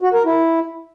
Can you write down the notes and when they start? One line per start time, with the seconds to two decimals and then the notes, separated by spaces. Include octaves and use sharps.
0.01 F#4
0.13 A#4
0.25 E4